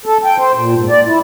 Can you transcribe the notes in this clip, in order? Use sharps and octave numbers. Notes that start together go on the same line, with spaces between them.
A4
G5
C5
A#2
G#2
D5
E4